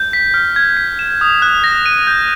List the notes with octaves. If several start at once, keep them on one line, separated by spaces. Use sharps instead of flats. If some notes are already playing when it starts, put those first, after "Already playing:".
Already playing: G6
B6
F6
G#6
B6
E7
D#6
F#6
A#6
D#7
G6